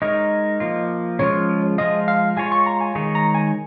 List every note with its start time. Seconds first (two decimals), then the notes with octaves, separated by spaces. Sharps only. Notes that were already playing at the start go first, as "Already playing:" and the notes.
0.02 G#3 D#4 A#4 C#5 D#5
0.60 F3 A#3 F4
1.19 C#3 F3 G#3 F4 C#5
1.78 F3 G#3 F4 D#5
2.08 F5
2.37 G#3 F4 C#5 G#5
2.52 C#6
2.66 A#5
2.81 G#5
2.95 D#3 G#3 D#4 G#4 C#5
3.15 A#5
3.34 G#5